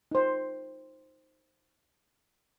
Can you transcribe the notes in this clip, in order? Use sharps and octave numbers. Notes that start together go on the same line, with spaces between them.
D#4 C5